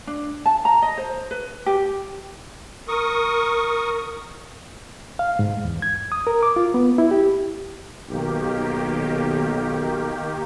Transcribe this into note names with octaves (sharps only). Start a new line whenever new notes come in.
D4
A5
A#5
D#5
C5
B4
G4
A#4 C#6 D#6
F5
G#2
E2
G#6
D#6
A#4
D6
F4
B3
E4
G4
B1 D#3 A#3 G4